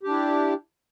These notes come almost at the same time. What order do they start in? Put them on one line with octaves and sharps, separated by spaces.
G4 D4 E4